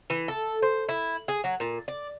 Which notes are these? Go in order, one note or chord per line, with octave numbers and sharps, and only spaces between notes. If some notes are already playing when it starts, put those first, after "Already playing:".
E3
A4
C5
E4
G#4
F#3
A#2
D5